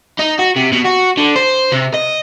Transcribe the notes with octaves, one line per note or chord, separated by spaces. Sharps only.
D#4
F#4
C3
B2
F#4
D3
C5
C3
D#5